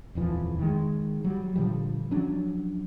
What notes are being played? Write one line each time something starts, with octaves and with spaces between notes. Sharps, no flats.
D#1 F2 E3 F3
D#3 G#3
F#3 G3
A#2 D3 F3 G3
F3 F#3 C#4 D4